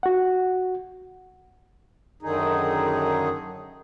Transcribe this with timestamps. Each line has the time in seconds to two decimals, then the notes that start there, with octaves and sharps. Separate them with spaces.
0.03 F#4 F#5
2.22 F#2 D3 D#3 D#4 G#4